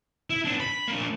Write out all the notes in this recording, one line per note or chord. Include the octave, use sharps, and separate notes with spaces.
E4
B3 D4
B5
A#3 D4